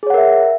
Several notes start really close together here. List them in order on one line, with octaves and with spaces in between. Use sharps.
G#4 C#5 F#5 A#4 E5